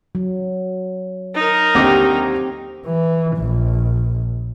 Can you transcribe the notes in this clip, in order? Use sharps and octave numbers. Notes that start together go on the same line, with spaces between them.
F#3
D#4 A#4
D#2 D3 C4 G4 D6
E3
A#1